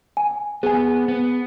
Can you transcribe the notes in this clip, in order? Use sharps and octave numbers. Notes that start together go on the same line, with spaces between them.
G#5
B3 G#4 G#5
B3